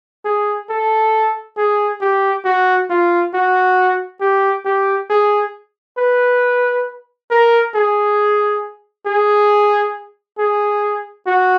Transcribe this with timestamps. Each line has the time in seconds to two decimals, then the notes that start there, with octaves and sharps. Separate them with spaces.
0.25 G#4
0.70 A4
1.57 G#4
2.01 G4
2.45 F#4
2.90 F4
3.34 F#4
4.21 G4
4.65 G4
5.10 G#4
5.98 B4
7.31 A#4
7.74 G#4
9.06 G#4
10.38 G#4
11.27 F#4